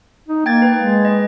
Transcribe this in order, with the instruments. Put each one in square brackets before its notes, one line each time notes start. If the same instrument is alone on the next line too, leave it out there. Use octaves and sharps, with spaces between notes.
[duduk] D#4
[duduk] A#3 [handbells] G5 G#6 A6
[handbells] B4
[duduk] G#3
[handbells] D#5